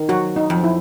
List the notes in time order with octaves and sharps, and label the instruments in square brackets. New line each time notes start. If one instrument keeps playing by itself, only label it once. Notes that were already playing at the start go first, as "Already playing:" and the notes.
Already playing: [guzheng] D#3
[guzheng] F#3 [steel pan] F#4
[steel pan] D#4
[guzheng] F2
[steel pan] E4